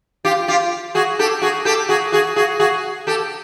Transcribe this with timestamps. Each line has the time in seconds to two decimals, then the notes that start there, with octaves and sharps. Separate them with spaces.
0.25 F4 G4
0.48 F4 G4
0.95 F#4 G#4
1.19 G4 A4
1.42 F#4 G#4
1.65 G4 A4
1.89 F#4 G#4
2.12 F#4 G#4
2.36 F#4 G#4
2.60 F#4 G#4
3.07 G4 A4